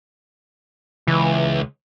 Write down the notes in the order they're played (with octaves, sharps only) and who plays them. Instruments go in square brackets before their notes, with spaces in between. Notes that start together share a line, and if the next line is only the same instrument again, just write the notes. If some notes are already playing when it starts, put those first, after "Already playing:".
[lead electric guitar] C#2 [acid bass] E3